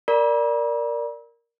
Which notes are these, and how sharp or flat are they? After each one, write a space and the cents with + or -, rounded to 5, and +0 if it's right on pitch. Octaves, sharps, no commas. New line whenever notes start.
A#4 +0 D5 +0 B5 -45